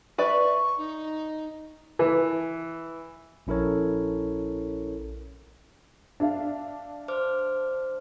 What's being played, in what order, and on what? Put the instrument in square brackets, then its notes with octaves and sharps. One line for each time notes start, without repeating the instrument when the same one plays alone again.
[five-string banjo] B4 D5 E5 [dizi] C#6
[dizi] D#4
[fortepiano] E3
[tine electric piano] A#1 C#4 E4 A4 A#4 C#5
[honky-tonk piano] D4 E5 F5
[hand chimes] C5 D6 F6